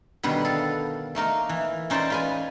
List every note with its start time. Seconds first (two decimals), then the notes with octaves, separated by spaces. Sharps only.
0.23 B2 D3 D#3 G3 B3
0.45 A4 F5
1.15 A3 A#3 D#4 A#4
1.49 E3
1.90 C#4 D#4 C5 D5 A5 A#5
2.10 F4 B4 G#5